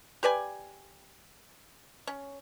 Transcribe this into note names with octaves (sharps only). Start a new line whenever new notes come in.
G4 B4 D5 G#5
C#4